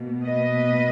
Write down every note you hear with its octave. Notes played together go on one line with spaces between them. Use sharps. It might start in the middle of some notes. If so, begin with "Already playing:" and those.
Already playing: B2 A#3
B4 D#5